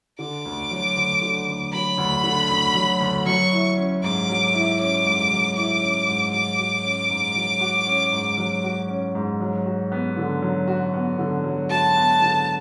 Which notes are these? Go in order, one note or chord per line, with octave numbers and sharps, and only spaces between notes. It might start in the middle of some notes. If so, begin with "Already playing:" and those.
D3 D6
D2
F#3
D2
D3
D2
F#3 B5
D2
D3
D2
F#3
D2
F#3 C#6
E4
C#4
G#2 D6
F#3
E4
C#4 D6
G#2
F#3
E4 D6
C#4
G#2
F#3 D6
F#4
C#4
G#2
F#3
F#4
C#4
G#2
F#3
F#4
C#4
G#2
F#3
F#4
B3
D3
F#3
F#4
B3
D3
F#3
F#4 A5
B3
D3